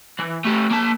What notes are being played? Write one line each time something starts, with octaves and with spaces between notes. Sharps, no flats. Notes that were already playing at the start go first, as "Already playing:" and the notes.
E3
A3 G4
A#3 A5